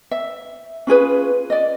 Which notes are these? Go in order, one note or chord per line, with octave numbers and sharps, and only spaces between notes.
E5
C#4 F4 G#4 B4
D5 D#5